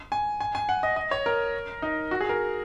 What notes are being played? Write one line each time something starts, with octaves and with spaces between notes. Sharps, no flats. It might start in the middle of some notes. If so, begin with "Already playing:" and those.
G#5
G#5
G#5
F#5
D#5
D#5
C#5
A#4
D#4
F#4
G#4
A#4